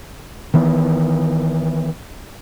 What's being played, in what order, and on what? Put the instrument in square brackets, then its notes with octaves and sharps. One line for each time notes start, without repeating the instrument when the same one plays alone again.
[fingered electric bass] D#3 E3 B3